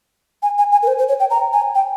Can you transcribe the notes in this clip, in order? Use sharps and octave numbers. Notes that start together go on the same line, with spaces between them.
G#5
G#5
G#5
A#4
C5
C5
C#5
G5
A#5
G#5
G5